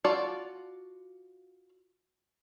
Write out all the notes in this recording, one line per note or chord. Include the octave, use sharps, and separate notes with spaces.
F4 F#4 D5 A5